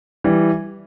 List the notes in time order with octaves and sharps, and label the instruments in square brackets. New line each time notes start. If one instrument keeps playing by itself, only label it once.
[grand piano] E3 G3